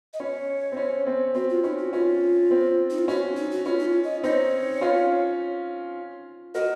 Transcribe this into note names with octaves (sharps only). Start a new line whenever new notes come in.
D#5
C#4 C#5
C4
C#4
C4
C4 F#4
F4
C#4 D#4
F#4
C#4 F4
C4
D#4
F4
C#4 F#4
D#4
F#4
C#4 F4
D#4
F4
D#5
C4 D#4 C#5
C#4 F4
F#4 A#4 D#5